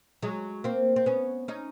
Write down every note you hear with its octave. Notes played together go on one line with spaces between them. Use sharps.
F#3 G#3
A#3 C4
C4
B3 C#4
C#4 D#4